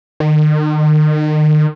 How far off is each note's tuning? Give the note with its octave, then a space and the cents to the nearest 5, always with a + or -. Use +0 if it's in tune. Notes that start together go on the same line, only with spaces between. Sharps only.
D#3 -35